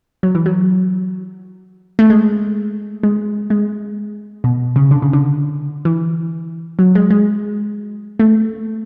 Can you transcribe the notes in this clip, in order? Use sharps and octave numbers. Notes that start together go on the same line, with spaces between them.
F#3
E3
F#3
A3
G#3
G#3
G#3
B2
C#3
D3
C#3
D3
E3
F#3
G#3
G#3
A3